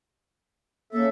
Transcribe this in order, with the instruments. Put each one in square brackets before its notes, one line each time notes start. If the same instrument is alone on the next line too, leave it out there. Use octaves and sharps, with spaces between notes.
[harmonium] C#3 A4 E5 [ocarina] A#3